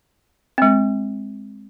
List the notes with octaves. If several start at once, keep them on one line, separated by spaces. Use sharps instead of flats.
G#3 C4